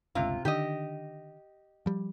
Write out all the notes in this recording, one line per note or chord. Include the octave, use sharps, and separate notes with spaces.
G1 C#2 C3 F4
D3 D#3 D4 G4 D#5
F3 G3